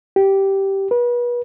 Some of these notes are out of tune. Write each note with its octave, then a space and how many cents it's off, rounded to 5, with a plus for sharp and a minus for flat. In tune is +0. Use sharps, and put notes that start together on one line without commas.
G4 -10
B4 -35